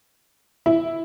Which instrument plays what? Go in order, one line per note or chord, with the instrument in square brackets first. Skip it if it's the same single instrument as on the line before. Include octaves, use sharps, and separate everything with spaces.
[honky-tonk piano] E4